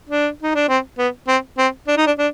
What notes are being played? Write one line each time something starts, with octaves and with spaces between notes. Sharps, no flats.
D4
D#4
D4
C4
B3
C4
C4
D4
D#4
D4
D4